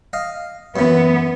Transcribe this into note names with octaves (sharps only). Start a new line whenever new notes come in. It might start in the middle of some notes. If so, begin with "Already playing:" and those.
D#5 F5
F#2 E3 B3